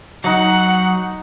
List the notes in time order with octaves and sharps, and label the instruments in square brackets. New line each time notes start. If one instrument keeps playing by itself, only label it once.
[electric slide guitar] F#3 [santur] D#4 D#6 [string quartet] F#5